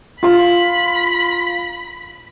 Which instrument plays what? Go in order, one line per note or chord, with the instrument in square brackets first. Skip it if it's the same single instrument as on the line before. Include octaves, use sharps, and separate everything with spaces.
[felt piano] F4 F5 C6 [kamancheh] B5